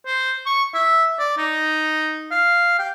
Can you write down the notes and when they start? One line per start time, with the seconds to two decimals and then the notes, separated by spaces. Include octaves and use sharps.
0.06 C5
0.46 C#6
0.74 E5
1.19 D5
1.38 D#4
2.31 F5
2.79 G5